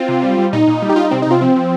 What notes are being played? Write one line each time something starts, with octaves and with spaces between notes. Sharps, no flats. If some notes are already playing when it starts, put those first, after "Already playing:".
Already playing: C4 F4
C3
G3
G3
A#2 D#4
A#2
G3
G4
G3 F4
D#4
C3 C4
D#4
C3 C4 F4
F3 C4
F3